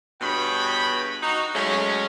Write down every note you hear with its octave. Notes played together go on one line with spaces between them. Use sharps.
G2 B2 G#4 C#5 G5 B5
D#4 F#4
F#3 G#3 A3 C#4